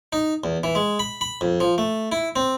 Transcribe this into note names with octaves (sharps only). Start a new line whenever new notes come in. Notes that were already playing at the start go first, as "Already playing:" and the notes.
D#4
E2
E3
G#3
B5
B5
F2
F3
A3
E4
C4